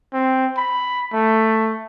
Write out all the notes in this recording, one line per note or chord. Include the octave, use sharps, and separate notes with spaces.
C4
B5
A3